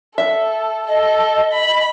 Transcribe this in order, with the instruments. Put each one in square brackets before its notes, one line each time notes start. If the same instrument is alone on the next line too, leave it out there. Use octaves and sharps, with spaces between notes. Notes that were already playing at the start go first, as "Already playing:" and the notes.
[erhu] A4 [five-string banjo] E5
[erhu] A4 [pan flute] D#5
[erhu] B5